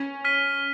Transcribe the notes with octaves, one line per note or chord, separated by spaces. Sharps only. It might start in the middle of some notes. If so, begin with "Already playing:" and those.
Already playing: C#4
F6 B6 D#7